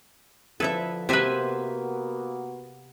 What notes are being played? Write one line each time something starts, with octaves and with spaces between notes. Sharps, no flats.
D3 F3 E4 A4 B4 E5
C3 A#3 B3 F#4 B4 C5 E5 G#5